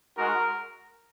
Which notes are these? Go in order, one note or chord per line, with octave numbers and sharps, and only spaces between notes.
G#3 D#4 F#4 A#4